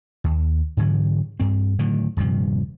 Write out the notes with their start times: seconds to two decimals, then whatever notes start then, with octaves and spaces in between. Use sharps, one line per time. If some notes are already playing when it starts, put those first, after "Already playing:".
0.24 D#2
0.77 G#2 D3 E3 F#3
1.40 G2 C4
1.79 A2 D3 D#3 F#3
2.17 D#1 G2 C3 F3